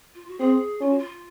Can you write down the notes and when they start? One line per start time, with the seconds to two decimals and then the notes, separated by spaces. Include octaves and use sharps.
0.15 F4
0.28 F#4
0.39 C4 G#4
0.81 C#4 F4
0.90 F#4
0.99 F4